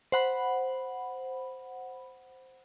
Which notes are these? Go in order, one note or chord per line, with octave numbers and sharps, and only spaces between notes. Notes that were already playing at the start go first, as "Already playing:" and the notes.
C5 F#5 B5